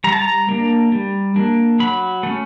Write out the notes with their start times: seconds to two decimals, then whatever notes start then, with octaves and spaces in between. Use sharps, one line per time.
0.04 G3 A#5
0.13 A5
0.22 A#5
0.49 A#3 D4
0.92 G3
1.36 A#3 D4
1.80 F#3 B5
2.23 A3 C#4